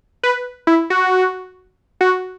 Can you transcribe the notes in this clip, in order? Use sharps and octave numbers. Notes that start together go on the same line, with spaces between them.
B4
E4
F#4
F#4